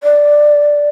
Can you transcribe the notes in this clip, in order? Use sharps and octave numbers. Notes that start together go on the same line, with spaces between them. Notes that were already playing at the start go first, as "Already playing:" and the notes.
D5